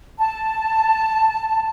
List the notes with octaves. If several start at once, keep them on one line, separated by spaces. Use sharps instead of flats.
A5